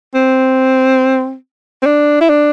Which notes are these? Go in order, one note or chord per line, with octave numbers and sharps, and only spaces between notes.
C4
C4
D4
E4
D4